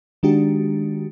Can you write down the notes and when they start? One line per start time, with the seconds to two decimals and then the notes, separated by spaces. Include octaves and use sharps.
0.23 D#3 G#3 D4 F#4 G4